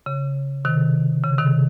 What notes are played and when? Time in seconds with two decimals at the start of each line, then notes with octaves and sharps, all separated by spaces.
0.06 C#3
0.65 C3 D#3
1.24 C#3
1.38 C3 D#3